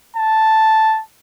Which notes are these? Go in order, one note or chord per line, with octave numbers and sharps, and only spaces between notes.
A5